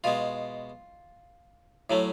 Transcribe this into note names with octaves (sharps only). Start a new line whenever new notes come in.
B2 G#3 F4
A2 F#3 A3